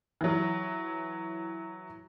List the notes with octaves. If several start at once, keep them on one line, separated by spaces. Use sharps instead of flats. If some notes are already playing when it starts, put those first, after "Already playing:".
E3 F#3